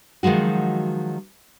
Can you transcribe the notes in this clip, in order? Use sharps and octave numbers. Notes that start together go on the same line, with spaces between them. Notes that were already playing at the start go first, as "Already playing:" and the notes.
D#3 F3 F#3 G#3 F#4